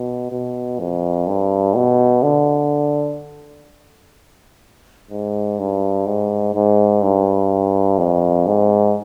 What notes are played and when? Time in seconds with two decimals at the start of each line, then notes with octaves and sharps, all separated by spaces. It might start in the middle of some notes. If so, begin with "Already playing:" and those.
Already playing: B2
0.32 B2
0.79 F2
1.28 G2
1.76 B2
2.23 D3
5.11 G#2
5.59 G2
6.07 G#2
6.55 G#2
7.02 G2
7.98 F2
8.47 G#2